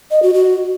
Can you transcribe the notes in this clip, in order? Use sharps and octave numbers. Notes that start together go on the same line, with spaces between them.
D#5
F#4
F#4